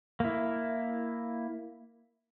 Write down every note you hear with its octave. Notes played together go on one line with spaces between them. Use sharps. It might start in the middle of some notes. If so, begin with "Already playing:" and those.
A#3 E4